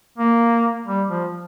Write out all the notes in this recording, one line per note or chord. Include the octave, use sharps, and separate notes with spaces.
A#3
G3
F3